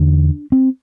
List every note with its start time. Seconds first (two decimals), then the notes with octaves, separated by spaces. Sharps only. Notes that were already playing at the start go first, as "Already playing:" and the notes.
Already playing: E2 D3 D4
0.52 C4